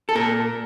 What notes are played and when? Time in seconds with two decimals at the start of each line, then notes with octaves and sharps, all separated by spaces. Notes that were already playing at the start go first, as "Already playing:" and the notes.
0.09 A4
0.15 A#2 A#4